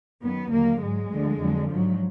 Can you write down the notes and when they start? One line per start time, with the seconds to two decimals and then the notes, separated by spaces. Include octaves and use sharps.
0.21 F#2 D#3 F#3 B3
0.52 D#2 D3 F#3 A#3
0.81 G#2 F#3 G#3
1.11 D2 D3 F3
1.40 F2 D3 F#3
1.70 G#2 F3 F#3